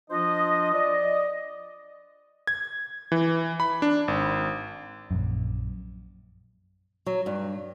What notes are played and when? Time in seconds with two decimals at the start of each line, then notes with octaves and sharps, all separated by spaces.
0.11 F3 D4 F4 C5 D#5
0.73 D5 D#5
2.47 G#6
3.12 E3
3.60 B5
3.82 D4
4.08 G#1
5.11 A#1 F#2
7.06 F#3
7.26 G2